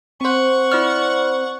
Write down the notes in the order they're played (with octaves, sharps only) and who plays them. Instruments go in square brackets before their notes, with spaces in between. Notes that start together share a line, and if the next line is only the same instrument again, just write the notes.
[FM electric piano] C4 C5 [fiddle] F#5 C#6
[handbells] E4 D5 F6